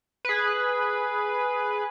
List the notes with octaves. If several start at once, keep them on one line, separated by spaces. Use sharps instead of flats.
G#4 B4